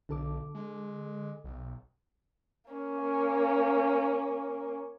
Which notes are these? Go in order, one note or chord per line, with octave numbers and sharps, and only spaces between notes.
B1 D3 A4 D6
G#3
B1
A#3 C#4